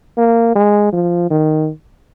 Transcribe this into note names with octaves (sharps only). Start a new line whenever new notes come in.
A#3
G#3
F3
D#3